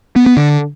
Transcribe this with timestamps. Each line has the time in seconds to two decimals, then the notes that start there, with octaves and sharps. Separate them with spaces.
0.16 B3
0.26 B3
0.37 D3